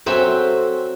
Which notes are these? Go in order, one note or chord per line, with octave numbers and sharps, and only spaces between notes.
F#3 C4 A4 C5 E5 G#5